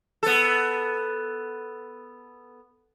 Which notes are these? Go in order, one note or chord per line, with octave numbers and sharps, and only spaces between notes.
B3 A4